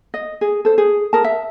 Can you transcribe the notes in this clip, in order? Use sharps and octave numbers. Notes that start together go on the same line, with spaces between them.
D#5
G#4
A4 C5
G#4
G#4 A#4 A5
E5